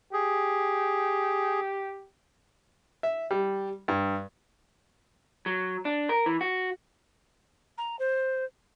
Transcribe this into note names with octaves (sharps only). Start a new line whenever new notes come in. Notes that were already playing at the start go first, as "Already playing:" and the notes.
G4 G#4
E5
G3
G2
F#3
D4
A#4
E3
F#4
A#5
C5